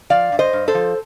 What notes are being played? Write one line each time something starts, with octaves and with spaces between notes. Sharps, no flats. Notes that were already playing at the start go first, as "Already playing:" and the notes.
F3 D5 F5
G2
C5 D#5
G2
A4 C5
F3